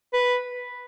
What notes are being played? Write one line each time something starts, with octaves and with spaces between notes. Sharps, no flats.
B4